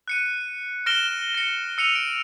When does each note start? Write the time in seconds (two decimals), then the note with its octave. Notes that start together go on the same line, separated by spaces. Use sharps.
0.08 F#6 C#7 D#7
0.86 F6 A#6 D7 E7 G7
1.34 A#6 C#7
1.78 E6 C#7 D#7 F7
1.95 D7